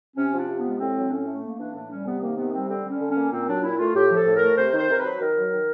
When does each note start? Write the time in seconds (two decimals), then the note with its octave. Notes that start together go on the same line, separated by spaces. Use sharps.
0.17 C3 C#4
0.33 F3
0.39 D4
0.49 C3
0.59 B3
0.65 G#3
0.80 A2 C4
0.96 F#3
1.07 D4
1.11 A2 C#4
1.27 A3
1.43 A#3
1.59 E3 D4
1.75 A2 D4
1.91 G3 C#4
2.06 C3 B3
2.22 D#3 A#3
2.38 C3 B3
2.53 G3 C4
2.69 D3 C4
2.85 G3 C#4
3.00 D3
3.11 C#4
3.16 A#3
3.32 A#2 C4
3.48 F#3 D4
3.63 A#2 E4
3.79 A3 F4
3.95 A2 G4
4.11 F3
4.16 A4
4.26 A2
4.36 A#4
4.41 A3
4.57 C3 C5
4.73 D#3
4.78 C5
4.89 C3 A#4
4.99 B4
5.05 F#3
5.20 D#3 A#4
5.36 F#3
5.52 D#3